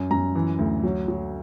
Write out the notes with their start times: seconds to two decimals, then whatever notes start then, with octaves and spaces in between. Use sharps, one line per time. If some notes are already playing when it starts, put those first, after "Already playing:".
Already playing: F#2
0.11 F#2 A#5
0.36 E3
0.59 D2
0.83 F#3
1.08 F#3